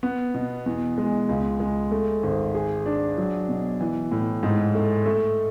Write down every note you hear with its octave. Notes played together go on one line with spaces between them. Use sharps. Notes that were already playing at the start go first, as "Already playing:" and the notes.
B3
B2
E2
G#3
C#2
G#3
A3
G#1
G#4
D4
F#3
B2
E3
A2
G#2
A3
A3